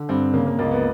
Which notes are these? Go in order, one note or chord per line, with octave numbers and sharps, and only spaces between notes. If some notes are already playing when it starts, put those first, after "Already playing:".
Already playing: D3
G2 C4
C#3 A#3
A#3
C#2 A#3
B3